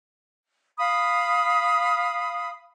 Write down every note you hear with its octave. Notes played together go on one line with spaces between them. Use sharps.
F5 B5 D#6